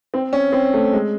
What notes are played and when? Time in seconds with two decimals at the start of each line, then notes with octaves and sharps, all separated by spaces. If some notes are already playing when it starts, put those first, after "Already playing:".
0.14 C4
0.33 C#4
0.52 C4
0.74 A3
0.93 G#3